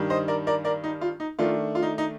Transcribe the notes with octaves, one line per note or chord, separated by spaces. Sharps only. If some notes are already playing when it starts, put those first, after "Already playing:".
Already playing: G2 D#3 G3
C5 D#5
A#4 D5
A#4 D5
A#4 D5
D#4
F4
D#4
D#3 A3 D4 F4
F4
D#4
D#4